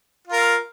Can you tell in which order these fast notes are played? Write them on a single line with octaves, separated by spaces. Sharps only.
F4 A#4 F5